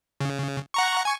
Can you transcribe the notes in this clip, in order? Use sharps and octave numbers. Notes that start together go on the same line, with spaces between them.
C#3
F#5 A#5 C#6
G#5 C#6